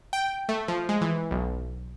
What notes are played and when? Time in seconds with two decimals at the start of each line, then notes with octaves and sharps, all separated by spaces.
0.13 G5
0.49 A3
0.68 F3
0.89 G#3
1.01 E3
1.31 B1